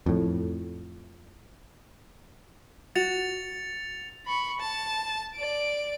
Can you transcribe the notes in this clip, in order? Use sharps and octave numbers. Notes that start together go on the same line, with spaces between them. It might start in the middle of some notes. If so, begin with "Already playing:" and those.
F2 A2
F#4 A6 C#7 F7
B5 C#6
A5
D5 D7